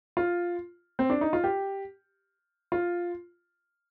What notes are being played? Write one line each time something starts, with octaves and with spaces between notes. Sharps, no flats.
F4
C4
D4
D#4
F4
G4
F4